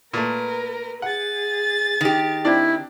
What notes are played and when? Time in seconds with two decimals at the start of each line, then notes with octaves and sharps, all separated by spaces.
0.14 A#2 A3 A#4 B4
1.02 G#4 F#5 A6
2.01 D#3 G4
2.45 C4 D4 E4 D5